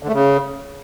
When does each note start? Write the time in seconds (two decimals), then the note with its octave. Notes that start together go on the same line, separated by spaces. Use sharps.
0.03 D3
0.08 A3
0.13 C#3